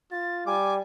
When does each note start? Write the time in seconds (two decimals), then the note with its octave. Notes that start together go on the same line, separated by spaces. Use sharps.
0.12 F4 A6
0.46 G3 G#5 D6